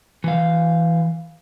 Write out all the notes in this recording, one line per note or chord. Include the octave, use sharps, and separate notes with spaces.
E3 F5